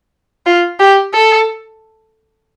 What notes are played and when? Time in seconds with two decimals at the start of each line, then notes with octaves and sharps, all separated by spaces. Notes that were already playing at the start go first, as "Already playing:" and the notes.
0.46 F4
0.80 G4
1.14 A4